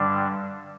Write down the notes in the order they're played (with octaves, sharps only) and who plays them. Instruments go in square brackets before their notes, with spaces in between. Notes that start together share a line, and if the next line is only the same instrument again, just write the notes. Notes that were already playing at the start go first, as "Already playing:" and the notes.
Already playing: [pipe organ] G2 D3 G3 D4